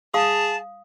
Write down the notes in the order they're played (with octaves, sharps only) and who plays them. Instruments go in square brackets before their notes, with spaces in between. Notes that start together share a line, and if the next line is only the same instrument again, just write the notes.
[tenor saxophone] G#4 [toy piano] F5 D#6 [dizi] A5